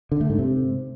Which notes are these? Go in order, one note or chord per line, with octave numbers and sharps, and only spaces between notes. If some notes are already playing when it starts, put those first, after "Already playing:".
D3
A3
G#2
C3